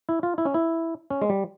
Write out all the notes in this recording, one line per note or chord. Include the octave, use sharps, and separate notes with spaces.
E4
F4
E4
C#4
E4
C#4
G#3
G3